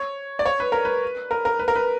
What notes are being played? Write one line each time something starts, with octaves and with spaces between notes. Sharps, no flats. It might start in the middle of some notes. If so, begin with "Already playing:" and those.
Already playing: C#5
D5
C#5
B4
A#4
B4
A#4
A#4
B4
A#4
B4